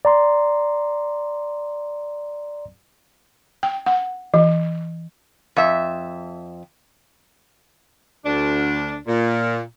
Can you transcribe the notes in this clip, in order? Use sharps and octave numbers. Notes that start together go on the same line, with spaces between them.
D5 A#5 C6
G5
F#5
E3
F2 E5
D2 D4
A#2